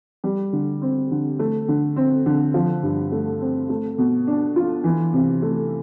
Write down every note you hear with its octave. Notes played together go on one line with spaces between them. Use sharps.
G3
D3
C4
D3
A3
D3
C4
D3
F3
G2
A3
C4
A3
B2
D4
F4
E3
C3
A3